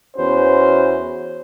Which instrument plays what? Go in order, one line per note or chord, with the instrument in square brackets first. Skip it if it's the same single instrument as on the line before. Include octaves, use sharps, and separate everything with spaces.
[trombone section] E2 C#4 F#4 B4 C5